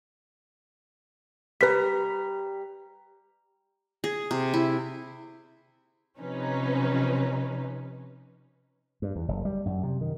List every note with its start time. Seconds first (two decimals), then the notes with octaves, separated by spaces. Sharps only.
1.61 G3 B4 A#5 B6
4.04 G#4
4.31 C3
4.54 E4
6.18 C3 F3 C#4 D#4 B4
9.02 G2
9.16 E2
9.28 F#1
9.45 G3
9.66 F#2
9.83 C3
10.01 D#3